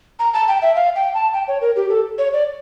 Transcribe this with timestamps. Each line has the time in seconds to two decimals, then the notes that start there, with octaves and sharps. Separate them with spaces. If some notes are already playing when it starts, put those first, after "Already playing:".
0.19 A#5
0.34 A5
0.48 G5
0.62 E5
0.76 F5
0.96 G5
1.14 A5
1.33 G5
1.48 C#5
1.61 A#4
1.76 G4
1.90 A4
2.18 C#5
2.33 D5